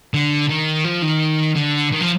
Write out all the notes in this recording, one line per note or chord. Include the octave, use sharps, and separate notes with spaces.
D3
D#3
F3
D#3
D3
D#3
F3